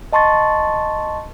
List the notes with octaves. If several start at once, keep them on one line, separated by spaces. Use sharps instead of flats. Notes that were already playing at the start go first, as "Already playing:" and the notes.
D#5 A5 C6 C#6 A6